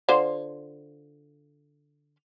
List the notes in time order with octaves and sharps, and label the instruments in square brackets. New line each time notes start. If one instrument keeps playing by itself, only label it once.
[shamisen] D3 F4 C5